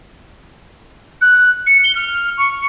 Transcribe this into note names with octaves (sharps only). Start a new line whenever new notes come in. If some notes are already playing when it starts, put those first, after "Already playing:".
F#6
C#7
G7
F6
C#6